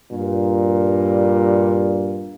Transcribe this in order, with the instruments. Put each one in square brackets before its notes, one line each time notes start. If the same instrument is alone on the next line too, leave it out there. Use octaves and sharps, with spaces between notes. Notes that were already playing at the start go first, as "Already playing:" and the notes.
[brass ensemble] G2 A#2